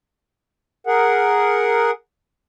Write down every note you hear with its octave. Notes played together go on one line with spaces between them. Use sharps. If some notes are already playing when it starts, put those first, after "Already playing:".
G#4 A#4 F#5